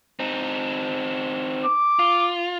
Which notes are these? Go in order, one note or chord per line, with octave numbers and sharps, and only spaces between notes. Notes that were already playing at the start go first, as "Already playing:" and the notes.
C4 D#4
D6
F4